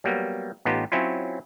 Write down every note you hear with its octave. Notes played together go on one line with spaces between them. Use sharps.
F#3 G3 A#3 B3
A1 B3 D#4 F4 G4 A5
F#3 C4 C#4 E4 F4